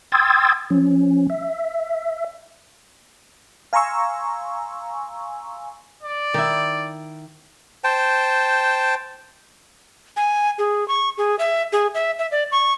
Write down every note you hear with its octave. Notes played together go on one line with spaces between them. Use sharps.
G5 C6 D#6 E6 G#6 A6
F3 C#4
E5
F5 G#5 A#5 C6 C#6 E6
D5
D#3 E4
C5 G5 A5
G#5
G#4
C#6
G#4
E5
G#4
E5
E5
D5
C#6